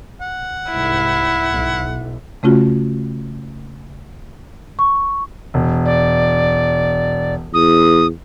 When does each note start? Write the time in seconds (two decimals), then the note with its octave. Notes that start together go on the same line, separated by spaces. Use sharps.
0.21 F#5
0.71 C2 G#2 E4
1.52 B1
2.43 C#3 A3 C#4 F4 F#4
4.79 C#6
5.54 E1
5.85 D5
7.54 E2 D#6